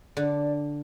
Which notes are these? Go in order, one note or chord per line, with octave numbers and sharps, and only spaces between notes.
D3 D5